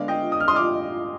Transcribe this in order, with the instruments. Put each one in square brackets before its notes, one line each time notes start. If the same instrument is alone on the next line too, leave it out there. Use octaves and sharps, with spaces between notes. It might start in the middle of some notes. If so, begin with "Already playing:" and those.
Already playing: [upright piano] D3 G#3 B3 D4 D5 F5
D#5 G5
D#6
F6
C6 D#6
D6 F6